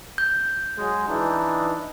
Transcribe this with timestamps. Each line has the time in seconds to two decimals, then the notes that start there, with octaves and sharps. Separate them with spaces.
0.18 G6
0.78 F#3 G#3
1.09 E3 D4 D#4